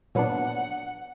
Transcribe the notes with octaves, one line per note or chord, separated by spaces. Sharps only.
A#2 F#3 B3 D4 F#5